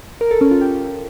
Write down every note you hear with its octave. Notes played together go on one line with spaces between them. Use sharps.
A#4
A4
C#4
F4
G4